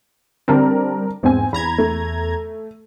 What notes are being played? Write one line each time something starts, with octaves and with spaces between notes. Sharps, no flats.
D3 G3 C4 D4 A#4 A5
E2 G#2 B3 C4 G#5
E2 A#5 B5 G#6
A3